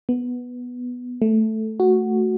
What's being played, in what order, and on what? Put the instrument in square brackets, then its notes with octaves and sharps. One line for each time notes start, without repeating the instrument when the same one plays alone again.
[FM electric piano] B3
A3
F#4